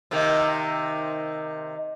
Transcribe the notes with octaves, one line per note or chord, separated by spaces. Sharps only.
C3 D#3 A#3